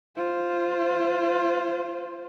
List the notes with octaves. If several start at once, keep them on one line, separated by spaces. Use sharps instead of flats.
F4 C5